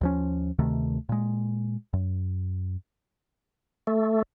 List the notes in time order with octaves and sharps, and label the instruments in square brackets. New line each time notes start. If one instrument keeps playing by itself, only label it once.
[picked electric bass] D#2 F3 C#4
D2 C3 D#3 A3
A#2 G#3
F#2
[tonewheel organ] A3